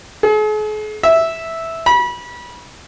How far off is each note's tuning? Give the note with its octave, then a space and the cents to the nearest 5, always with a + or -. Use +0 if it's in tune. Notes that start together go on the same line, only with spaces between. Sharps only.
G#4 +45
E5 -5
B5 -30